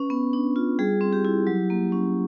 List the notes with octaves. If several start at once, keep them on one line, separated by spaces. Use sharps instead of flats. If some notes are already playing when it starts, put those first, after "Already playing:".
Already playing: C#4 B4
B3
D4
F4
G3 G#4
C4
G4
E4
F#3
A#3
C#4